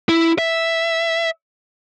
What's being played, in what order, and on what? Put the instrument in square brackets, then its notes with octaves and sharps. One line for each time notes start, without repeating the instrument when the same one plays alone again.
[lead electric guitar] E4
E5